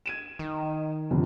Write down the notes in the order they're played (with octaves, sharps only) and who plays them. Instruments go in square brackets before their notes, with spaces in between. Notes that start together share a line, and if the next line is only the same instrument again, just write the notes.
[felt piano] G#6 D#7 E7
[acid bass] D#3
[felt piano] G1 F2 C3